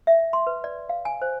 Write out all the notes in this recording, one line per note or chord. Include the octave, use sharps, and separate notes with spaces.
E5
C6
B4
D5
F5
G#5
C5